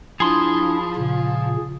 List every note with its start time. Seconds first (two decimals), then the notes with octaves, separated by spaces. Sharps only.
0.20 F3 D4 E4 G#4 C6 D#6
0.96 A#2 C#3